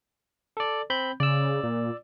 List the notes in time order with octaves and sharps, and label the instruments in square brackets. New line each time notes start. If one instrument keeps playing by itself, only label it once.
[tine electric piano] A4 D5
C4 B5 G6
[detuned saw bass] C#3 [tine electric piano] D5 E6
[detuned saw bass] A#2